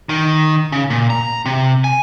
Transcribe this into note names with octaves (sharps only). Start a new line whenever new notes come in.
D#3
C#3
A#2
A#5
C3
G#5